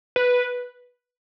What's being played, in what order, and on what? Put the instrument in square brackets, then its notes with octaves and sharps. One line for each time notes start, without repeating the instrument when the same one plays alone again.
[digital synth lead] B4